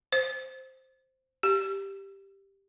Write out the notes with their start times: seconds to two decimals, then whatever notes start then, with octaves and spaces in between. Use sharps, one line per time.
0.12 C5
1.43 G4